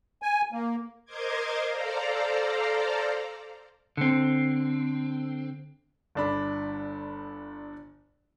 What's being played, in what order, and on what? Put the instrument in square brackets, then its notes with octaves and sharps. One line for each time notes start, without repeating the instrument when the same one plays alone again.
[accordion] G#5
A#3
[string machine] A#4 C5 D#5 C6 D6 G#6
A4 C5 D5 F5 A#5
[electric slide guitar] D3 C4
[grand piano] G1 D4 B5